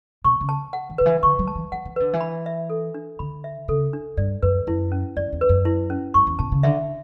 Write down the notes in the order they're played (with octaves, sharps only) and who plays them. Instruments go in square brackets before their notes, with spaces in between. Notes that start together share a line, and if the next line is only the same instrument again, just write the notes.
[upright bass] B2 [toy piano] C#6
[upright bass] C#3
[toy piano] A5
F#5
[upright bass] E3
[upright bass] D3 [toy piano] B4
[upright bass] E3
[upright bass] D3 [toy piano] C#6
[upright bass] F#3
[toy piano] A5
[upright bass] E3
[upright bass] F#3 [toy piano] F#5
[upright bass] E3
[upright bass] D3 [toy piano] B4
[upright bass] E3
[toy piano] B5
E5
A4
D4
[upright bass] D3 [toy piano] B5
[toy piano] E5
[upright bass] C#3 [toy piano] A4
[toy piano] D4
[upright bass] G2 [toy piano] D5
[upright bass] F#2 [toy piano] B4
[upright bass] F#2 [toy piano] E4
[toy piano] C#4
[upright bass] F#2 [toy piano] D5
[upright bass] E2
[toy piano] B4
[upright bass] F#2
[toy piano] E4
C#4
[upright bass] G2 [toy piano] C#6
[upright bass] E2
[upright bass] B2 [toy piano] A5
[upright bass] C#3
[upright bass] D3 [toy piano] E5